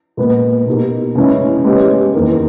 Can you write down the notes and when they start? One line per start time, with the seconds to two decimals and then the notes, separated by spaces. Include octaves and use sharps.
0.17 A#2 G#3 B3
0.66 B2 A#3 D#4 G4 A#4
1.15 C#3 E3 G#3 C#4 E4
1.64 G#3 B3 G4 C#5
2.14 E2 D#3 A#3